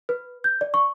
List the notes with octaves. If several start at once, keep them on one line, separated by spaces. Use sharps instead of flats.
B4
G6
D5
C#6